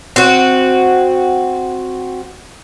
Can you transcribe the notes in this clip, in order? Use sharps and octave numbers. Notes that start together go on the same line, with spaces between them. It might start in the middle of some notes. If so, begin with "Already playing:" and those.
C4 F#4